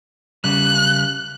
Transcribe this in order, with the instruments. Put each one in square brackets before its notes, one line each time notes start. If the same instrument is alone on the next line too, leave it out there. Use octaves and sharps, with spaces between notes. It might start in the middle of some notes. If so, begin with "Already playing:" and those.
[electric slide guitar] C#3 G3 [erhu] F#6